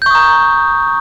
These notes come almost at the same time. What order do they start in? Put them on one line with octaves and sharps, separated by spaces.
G6 C#6 D#6 A#5